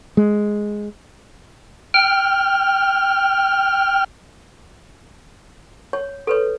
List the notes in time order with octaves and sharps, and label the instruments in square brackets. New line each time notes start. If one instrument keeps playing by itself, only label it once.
[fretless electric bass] G#3
[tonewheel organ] G5 F6
[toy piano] C#5
A4 B4 C#5